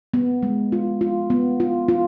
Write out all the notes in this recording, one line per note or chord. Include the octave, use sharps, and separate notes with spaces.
B3
G#3
F4
F4
B3
F4
F4